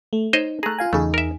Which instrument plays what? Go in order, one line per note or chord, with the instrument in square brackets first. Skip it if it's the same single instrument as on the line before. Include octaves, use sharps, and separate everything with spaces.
[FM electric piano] A3
[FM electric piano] D#4 [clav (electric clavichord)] C5 C#5 D#5
[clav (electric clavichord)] A3 G#4 [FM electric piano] A#5 F#6
[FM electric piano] F4 F5 G#5
[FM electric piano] E2 D#4 G#4 [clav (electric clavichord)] C#3 A3
[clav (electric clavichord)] A#4 E5